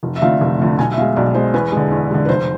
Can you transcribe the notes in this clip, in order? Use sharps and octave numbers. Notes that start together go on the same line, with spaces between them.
F1
E5
F2 D3 A3 F5
F1
F2 D3 A3
B1 G#5
E5
B2 G#3 F5
B1 D5
B2 G#3 C5
E2 B4
D3 G#3
E2
D3 G#3
B4
F1 C5